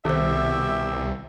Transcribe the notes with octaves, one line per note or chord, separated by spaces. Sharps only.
C2 B2 D#3 G4 C5 E5